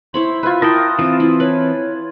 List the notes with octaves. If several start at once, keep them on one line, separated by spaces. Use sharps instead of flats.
E4 C5 C#5 B5 C6
F4 B4 E5 G#5
E4 A#4 G5 A5 D#6
E3 C4 F4
E4
B4 C#5